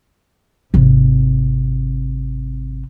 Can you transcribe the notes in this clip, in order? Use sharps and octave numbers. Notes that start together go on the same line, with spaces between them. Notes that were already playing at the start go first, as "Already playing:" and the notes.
G#1 C3